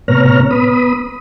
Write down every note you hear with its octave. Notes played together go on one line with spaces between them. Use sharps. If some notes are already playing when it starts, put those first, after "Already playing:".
A2 C3 B3 C#5 A#5 F6
B3 B5 D#6